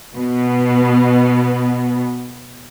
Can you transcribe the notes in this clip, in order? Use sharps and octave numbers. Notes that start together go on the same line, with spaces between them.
B2 B3